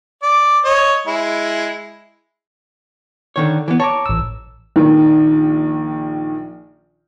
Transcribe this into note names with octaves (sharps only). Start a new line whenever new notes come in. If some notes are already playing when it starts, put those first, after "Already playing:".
D5
C#5 D#5
G#3 E4
D3 D#3 C#5
E3 B3
C#5 A5 A#5 D6
A1 E6
A#1 D#3